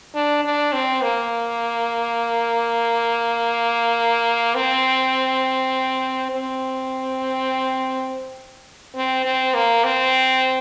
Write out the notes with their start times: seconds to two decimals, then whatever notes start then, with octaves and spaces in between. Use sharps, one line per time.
0.15 D4
0.45 D4
0.73 C4
1.03 A#3
4.55 C4
6.32 C4
8.95 C4
9.25 C4
9.54 A#3
9.84 C4